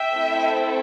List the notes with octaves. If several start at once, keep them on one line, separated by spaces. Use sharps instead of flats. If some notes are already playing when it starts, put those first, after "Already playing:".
Already playing: E5 G5
A3 C4 E4 A4